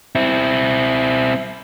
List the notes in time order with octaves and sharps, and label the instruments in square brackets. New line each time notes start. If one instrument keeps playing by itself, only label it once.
[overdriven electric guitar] C4 E4